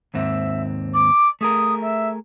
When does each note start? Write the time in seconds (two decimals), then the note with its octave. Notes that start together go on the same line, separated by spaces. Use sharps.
0.14 D#2 G#2 C4 E5
0.93 D6
1.41 A3 G#4 A#4 D#6
1.81 E5